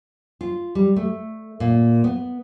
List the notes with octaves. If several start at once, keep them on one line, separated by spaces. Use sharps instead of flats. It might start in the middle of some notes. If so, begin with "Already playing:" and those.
F4
G3
A3
A#2
B3